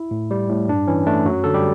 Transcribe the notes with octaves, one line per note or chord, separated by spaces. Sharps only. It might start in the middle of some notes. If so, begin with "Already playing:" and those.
Already playing: E4
A2
G3
A2
G2 D4
E3 C#4
A3 D4
F#2 F#3 F#4
D3 A4
G3 G4